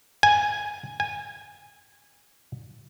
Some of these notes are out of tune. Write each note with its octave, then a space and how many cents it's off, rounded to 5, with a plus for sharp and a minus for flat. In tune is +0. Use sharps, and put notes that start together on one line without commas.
G#5 -5
G#5 -15